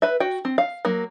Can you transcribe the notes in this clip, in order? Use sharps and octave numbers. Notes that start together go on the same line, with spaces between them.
B4 E5
F#4 G5
C4
F5
F#3 A#3